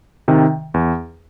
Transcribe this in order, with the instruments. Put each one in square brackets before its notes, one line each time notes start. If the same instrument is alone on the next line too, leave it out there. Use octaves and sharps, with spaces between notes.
[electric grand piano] C3 D#3
E2